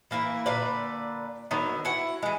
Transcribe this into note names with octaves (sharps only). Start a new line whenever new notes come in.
E3 A#3 E4 B4
A#2 D3 B4 D5
D3 D#3 F#3 B3
E4 F#4 F#5
E3 G#3